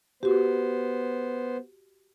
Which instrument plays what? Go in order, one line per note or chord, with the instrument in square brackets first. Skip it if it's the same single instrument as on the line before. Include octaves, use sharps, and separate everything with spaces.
[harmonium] B3 C5 [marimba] F#4 G4